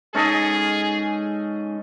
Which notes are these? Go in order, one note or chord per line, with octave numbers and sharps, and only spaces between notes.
G#3 C#4 D#4 G#4 A4 D#5